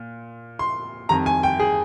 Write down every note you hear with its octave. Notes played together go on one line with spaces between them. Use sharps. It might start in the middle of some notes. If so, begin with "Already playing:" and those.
Already playing: A#2
C6
F2 D#3 G3 A#5
G#5
G5
G#4